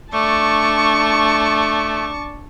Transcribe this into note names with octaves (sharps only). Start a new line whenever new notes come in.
A3 D4 D5 A5 C#6